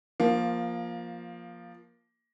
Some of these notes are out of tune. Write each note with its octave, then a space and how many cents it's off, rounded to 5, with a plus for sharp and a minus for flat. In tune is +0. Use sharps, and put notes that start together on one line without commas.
F3 +0 A#3 +15